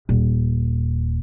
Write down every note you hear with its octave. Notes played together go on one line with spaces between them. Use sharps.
D#1